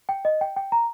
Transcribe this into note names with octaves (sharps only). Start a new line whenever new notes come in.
G5
D#5
G5
G5
A#5